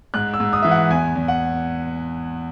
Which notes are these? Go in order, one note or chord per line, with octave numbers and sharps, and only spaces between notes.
G#2 F#6
E6
G#2
D#6
E3 E5
F#5
E2 G#5
E2
F#5